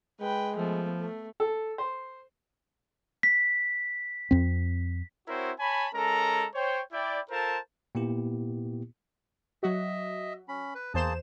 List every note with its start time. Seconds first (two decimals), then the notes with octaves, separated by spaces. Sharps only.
0.20 G#3 B4 G5
0.56 F3 A3 B3
1.00 A3
1.40 A4
1.78 C5
3.23 B6
4.31 F2 C4
5.28 C4 E4 F#4 A#4 C5 C#5
5.60 C#5 G#5 A5 B5
5.94 G#3 C#4 A4 A#4 A#5
6.55 C5 C#5 G5
6.93 E4 D5 G5
7.30 F4 A4 A#4 C5 A5
7.95 A#2 A#3 B3 E4 G4
9.63 F#3 F#4 D#5 E5
10.48 C#4 B5
10.75 B4
10.94 E2 A#3 G#4 C5 A5 E7